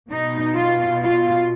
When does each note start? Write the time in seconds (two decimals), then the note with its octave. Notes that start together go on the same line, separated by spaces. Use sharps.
0.10 B2 D#4
0.56 F4
1.02 F4